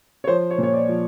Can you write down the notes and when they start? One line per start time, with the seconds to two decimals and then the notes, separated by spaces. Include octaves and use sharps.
0.24 C#5
0.27 F3 C5
0.50 C#5
0.58 A#2
0.63 C#5
0.74 D5
0.88 F3